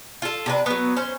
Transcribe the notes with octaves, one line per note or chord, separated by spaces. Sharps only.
F4 A4
C3 D4 B4
F#3 B3
C#4 C5